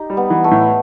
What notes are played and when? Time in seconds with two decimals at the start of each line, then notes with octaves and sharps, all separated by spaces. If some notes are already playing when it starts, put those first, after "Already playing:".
Already playing: D#4 G4
0.10 G3
0.17 B3
0.30 E3
0.44 A3
0.51 A2